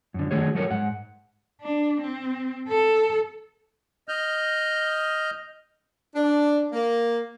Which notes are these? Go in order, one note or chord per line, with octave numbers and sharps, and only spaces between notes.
F#2 D3
D#3 F#3 A3 G#4 C#5
F#3 A3 A4 A#4 C#5
G#2 F#5
D4
C4
A4
D#5 F6 G6
D4
A#3